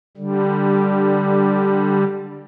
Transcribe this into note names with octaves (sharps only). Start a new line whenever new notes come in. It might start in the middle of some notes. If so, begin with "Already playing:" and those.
D3 G3